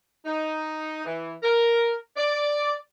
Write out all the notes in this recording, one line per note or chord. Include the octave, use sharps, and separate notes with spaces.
D#4
E3
A#4
D5